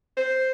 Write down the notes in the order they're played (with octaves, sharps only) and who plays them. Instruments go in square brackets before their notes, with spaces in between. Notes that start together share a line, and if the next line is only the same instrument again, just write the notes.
[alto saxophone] C5